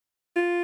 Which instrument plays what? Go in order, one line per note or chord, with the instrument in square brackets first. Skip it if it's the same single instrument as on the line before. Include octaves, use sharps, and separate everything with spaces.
[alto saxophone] F4